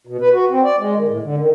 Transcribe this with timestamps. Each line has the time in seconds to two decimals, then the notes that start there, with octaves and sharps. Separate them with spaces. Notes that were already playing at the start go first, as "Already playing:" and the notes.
0.07 B2
0.21 B4
0.33 F#4
0.50 C4
0.64 D5
0.78 G#3
0.96 D#3
1.08 A2
1.22 D3
1.38 D#3